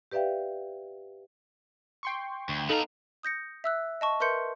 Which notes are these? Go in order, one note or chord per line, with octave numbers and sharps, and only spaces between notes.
G4 B4 D5 E5 F5 G5
G5 C6 C#6
D2
B3 D#4 A4 F5 A#5
D#6 G6 A#6 C#7
E5 E6 F#6
D#5 A5 C#6
A#4 B4 E5 C6 G6 C#7